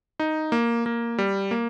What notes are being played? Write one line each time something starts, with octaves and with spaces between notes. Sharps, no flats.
D#4
A#3
A#3
G3
A#3